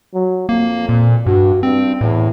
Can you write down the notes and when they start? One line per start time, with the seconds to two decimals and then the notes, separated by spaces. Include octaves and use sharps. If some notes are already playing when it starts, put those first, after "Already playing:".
0.14 F#3
0.49 F2 A#3
0.89 A#2
1.26 G2 F#4
1.63 G2 C4
2.01 E2 A2